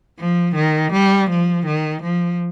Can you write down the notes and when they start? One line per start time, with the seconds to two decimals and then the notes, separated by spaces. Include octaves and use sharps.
0.20 F3
0.56 D#3
0.93 G3
1.30 F3
1.66 D#3
2.03 F3